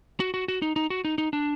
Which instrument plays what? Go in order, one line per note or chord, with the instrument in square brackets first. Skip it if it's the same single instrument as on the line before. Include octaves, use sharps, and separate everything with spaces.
[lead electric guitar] F#4
F#4
F#4
D#4
D#4
F#4
D#4
D#4
D4